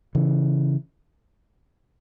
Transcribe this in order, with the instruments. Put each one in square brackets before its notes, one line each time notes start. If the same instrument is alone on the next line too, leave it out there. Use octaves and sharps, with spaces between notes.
[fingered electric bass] C#3 E3